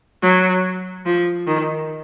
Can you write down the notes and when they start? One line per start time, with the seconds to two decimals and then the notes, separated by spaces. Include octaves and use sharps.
0.23 F#3
1.06 F3
1.47 D#3